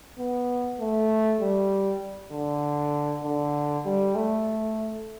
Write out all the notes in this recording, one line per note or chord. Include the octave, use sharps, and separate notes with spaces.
B3
A3
G3
D3
D3
G3
A3